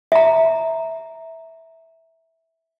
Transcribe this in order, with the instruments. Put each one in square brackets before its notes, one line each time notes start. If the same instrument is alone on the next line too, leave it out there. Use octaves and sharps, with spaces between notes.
[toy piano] E5 A#5